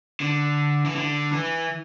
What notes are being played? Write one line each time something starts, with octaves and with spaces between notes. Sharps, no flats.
D3
E3
D3
E3